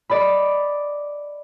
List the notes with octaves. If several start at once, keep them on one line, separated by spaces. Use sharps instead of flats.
D5 D#5 B5